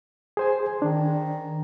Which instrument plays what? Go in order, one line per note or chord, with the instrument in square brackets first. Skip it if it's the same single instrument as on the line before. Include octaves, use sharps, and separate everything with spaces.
[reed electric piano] G#4 C5 G#5
[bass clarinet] D#3 [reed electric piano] D4